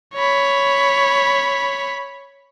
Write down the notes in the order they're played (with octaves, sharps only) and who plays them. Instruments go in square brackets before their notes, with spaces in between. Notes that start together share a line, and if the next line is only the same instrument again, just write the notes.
[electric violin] C#5 B5